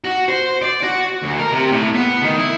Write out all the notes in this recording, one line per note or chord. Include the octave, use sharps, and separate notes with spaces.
F#4
C5
D5
F#4
D2
A#4
C3
A2
B3
D#3
E4